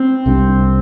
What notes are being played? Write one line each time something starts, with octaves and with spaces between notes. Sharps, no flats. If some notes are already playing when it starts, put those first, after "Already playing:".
Already playing: C4
C2 C3 G3 D4